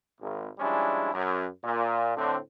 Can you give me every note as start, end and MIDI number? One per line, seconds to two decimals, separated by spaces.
0.21 0.46 32
0.59 1.09 53
0.59 1.09 55
0.59 1.09 56
0.59 1.09 61
0.59 1.09 62
0.59 1.09 64
1.13 1.46 42
1.64 2.13 46
2.16 2.37 45
2.16 2.37 50
2.16 2.37 60